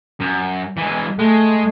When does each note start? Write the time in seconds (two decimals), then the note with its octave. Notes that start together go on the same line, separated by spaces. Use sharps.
0.20 F#2
0.77 E3 G#3
1.19 G#3 A3